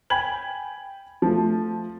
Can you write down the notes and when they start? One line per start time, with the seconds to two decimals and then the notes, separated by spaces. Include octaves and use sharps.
0.10 G5 G#5 B5 G#6 F#7
1.22 F3 A3